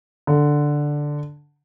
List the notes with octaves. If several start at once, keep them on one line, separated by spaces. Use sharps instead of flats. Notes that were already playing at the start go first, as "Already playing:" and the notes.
D3